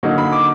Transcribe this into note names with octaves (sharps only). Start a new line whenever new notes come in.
D3 F#3 A#3 D#4
B5
D6